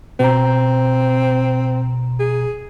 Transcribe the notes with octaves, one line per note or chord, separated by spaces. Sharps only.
B2 C4 A#5
G#4